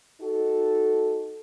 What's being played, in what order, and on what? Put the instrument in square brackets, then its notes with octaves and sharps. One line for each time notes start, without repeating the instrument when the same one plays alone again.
[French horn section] D#4 F#4 A4